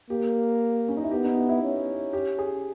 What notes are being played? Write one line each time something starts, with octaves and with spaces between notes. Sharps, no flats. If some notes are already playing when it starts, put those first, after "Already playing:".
A#3 G4
C#4
D#4
E4
B3 G4
D#4
E4
E4
C#4
G4
G#4